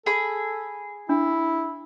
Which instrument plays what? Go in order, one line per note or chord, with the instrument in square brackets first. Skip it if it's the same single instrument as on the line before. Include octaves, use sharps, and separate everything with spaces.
[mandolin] G#4 B5 [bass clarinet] A4
[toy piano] D4 [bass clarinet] E4